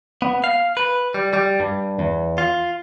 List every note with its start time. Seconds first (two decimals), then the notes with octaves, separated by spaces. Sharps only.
0.22 B3
0.44 F5
0.77 B4
1.14 G3
1.33 G3
1.60 G2
1.99 E2
2.38 F4